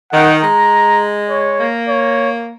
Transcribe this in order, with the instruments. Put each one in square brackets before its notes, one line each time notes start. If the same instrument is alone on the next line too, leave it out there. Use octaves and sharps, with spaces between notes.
[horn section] D#3 [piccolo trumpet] F#5
[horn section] G#3 [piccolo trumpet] A#5
[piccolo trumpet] C#5
[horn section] A#3
[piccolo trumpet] C#5